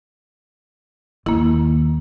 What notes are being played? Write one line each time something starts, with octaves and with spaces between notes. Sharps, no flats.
D#2 A#3 E4